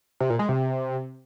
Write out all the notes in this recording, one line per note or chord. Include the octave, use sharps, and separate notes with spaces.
C3
A#2
G#3
C3